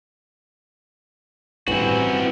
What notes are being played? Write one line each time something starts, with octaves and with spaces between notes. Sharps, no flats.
A1 G2 E3 C4 F#4